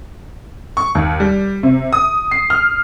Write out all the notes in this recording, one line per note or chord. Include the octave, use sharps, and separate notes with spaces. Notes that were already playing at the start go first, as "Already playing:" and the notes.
C#6
D#2
G3
C3
D#6
C7
F6